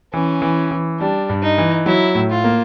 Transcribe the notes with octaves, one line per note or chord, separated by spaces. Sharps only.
E3 C#4
E3
E3
G3 D4
G2
D#4
E3
F#3 E4
A2
F4
A#3